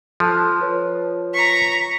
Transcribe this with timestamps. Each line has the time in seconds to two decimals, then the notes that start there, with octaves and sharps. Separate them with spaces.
0.20 F3 A4 A5 F#6
0.60 F4 B4 C#5
1.34 A#5 C#6 B6